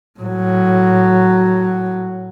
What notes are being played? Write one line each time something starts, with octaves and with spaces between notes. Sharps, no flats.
A2 F#3